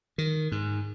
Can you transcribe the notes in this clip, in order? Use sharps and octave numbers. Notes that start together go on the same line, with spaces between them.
D#3
G#2